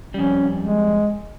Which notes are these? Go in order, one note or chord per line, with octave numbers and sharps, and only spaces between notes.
F2 G3 C#4
G#3